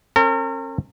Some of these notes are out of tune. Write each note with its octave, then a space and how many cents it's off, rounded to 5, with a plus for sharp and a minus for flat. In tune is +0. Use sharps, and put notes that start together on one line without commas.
C#4 -45 A#4 -40